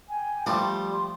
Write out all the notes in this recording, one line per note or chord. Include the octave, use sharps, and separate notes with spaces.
G5 G#5
F3 G3 A3 D4 G5 C6